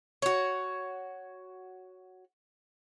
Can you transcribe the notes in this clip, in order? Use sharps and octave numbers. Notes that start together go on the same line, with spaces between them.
F#4 C#5